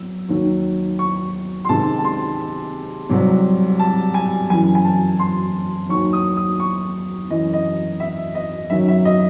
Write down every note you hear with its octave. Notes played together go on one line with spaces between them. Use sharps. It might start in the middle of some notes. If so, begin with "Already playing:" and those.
Already playing: F#3 E6
D#2 D#3 F#3
C#6
C6
C#2 C3 D#3 A5
A5
C6
C2 C3 F#3
A5
G#5
F#2 E3 G#5
G#5
A5
C6
D#2 D#3 F#3 C#6
D#6
D#6
C#6
F#2 E3 D#5
D#5
E5
D#5
F#2 D#3 F#3 E5
E5
D#5